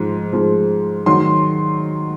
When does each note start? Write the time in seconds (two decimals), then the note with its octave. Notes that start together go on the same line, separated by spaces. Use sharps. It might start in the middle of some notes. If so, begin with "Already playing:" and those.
Already playing: G#2 F3
0.33 G#2 F3
1.06 D#3 F#3 C6